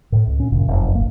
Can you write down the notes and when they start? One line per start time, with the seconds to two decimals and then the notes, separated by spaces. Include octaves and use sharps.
0.12 A2
0.27 C#2
0.39 A#2 C#4
0.52 G#1 F#2 A#2 C#3
0.68 F1 A#1 F#2
0.95 D1 G1 A#3